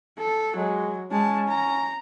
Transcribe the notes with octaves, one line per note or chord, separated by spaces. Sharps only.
A4
F#3 G#3
G#3 C#4 A5
A#5